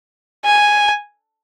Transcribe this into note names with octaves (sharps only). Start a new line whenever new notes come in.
G#5